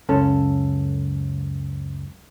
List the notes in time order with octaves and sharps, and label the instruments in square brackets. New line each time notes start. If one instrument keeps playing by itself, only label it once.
[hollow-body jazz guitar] C#2 F#2 C#4 A4